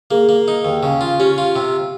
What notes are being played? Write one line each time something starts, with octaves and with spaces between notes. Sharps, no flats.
A#3 G#4
A#3
D#4
D#2
C#3
F4
C#4 G4
F4
C3